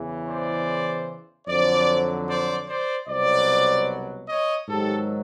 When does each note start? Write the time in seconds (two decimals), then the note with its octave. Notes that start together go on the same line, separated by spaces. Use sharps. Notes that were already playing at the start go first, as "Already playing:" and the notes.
Already playing: E2 C#3 E3
0.27 C5 D5
1.48 F2 D3 F#3 C5 D5
2.28 C5 D5
2.68 C5 D5
3.08 C2 B2 F#3 C5 D5
4.28 C#5 D#5
4.68 G#2 D#3 F#3 G4 A4